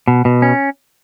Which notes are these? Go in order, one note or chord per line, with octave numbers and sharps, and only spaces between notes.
B2
B2
C#4